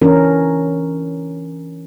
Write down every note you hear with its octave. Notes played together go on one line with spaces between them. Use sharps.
E3 C#4 D4 A#4